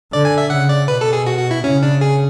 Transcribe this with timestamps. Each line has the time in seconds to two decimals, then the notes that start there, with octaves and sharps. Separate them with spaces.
0.13 D3 D5
0.25 G#5
0.38 E5
0.50 C#3 F#5
0.69 D5
0.88 B2 B4
1.01 A4
1.13 G#4
1.27 F#4
1.39 F#4
1.51 E4
1.64 C#3 C#4
1.83 D4
2.01 G#4